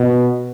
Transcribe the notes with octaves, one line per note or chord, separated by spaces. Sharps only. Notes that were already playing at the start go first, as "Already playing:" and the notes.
Already playing: B2